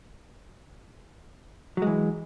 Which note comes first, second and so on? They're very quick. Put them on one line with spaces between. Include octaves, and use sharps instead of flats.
F#3 G#3 E3